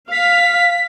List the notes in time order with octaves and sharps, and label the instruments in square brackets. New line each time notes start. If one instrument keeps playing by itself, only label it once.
[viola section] F5 [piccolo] B6